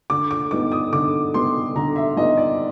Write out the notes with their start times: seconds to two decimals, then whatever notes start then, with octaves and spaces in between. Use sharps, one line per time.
0.10 D3 D6
0.31 D6
0.51 G3 B3 D#4 D6
0.72 D#6
0.93 D3 D6
1.34 G3 B3 D#4 C6
1.75 D3 A#5
1.96 E5
2.16 G3 B3 D#4 D#5
2.37 D5